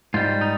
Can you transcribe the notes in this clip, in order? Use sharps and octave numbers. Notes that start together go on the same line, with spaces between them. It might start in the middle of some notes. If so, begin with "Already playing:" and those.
G#2 G3 F4
D#4